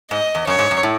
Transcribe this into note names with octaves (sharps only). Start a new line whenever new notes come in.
G#2 D#5
E2
F#2 C#5
G#2
F#2
A2